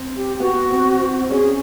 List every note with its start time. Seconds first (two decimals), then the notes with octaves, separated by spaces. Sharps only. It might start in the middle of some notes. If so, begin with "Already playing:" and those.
Already playing: C4
0.17 G4
0.40 B3 F#4
0.71 C4
1.00 C4
1.23 C4
1.30 C#4 G#4